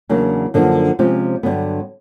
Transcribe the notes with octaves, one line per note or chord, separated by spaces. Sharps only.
E2 C#3 F#3 A#3 D4
F#2 D3 F3 A#3 D4
C3 F3 G#3 C#4 F4
G2 D3 F#3 B3